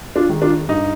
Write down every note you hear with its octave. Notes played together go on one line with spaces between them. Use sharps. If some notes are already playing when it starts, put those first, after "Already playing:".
D4 F4
D#3 G#3
D4 F4
G2 D#4